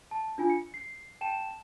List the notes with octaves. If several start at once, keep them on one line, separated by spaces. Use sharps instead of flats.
A5
D4 F4 G#5
C#7
C7
G5 A5 E7